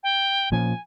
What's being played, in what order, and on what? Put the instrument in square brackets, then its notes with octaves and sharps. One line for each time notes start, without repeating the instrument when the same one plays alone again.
[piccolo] G5
[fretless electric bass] A#2 F3 C#4 [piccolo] G#5